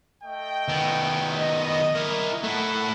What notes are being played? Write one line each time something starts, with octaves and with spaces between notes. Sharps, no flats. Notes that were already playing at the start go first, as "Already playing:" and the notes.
A3 D#5 G5
D#3 B3
D#5
E4 A#4
A3 E4 A4 F#5